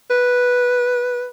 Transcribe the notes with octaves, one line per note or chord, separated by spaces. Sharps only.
B4